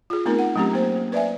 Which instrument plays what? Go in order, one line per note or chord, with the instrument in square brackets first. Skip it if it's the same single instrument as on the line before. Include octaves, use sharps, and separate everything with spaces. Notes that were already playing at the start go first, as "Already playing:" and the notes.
[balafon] F4 G#4
A3 B3 C4 D#4 A#4
F#5
F#3 A3 C4 C#4 G4
A#3 C5
B4 D5 E5 G#5